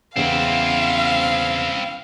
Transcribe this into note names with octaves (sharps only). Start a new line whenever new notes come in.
E2 C#3 C4 E4 F5